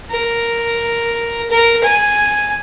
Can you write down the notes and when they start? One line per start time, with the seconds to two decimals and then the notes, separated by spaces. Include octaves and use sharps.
0.11 A#4
1.51 A#4
1.84 G#5